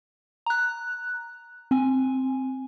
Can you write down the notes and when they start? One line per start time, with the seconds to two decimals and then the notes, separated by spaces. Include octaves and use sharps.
0.46 A#5 F#6
1.71 C4 G#5